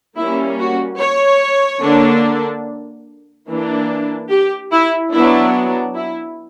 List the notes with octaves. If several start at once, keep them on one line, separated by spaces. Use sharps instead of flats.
G3 A#3 C#4 E4
F#4
C#5
D3 A#3 D4
E3 A#3 D4
G4
E4
F#3 B3 D4 E4
E4